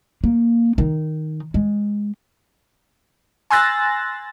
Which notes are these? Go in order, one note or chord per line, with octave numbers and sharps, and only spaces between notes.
A#3
D#3 D#4
G#3
G#5 C6 E6 F#6 A6 A#6